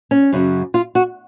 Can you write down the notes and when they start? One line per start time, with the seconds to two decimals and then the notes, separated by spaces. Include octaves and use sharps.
0.11 C#4
0.32 F#2 C#3 F#3
0.74 F4
0.95 F#4